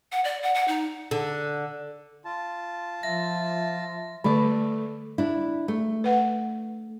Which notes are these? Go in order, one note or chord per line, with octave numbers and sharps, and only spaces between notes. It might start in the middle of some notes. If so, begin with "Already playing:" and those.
F#5
D5
F#5
F#5
D#4
D3
F4 A5
F3 E5 A#6
D3 A3 D5
D4 E4
A3
B4 F#5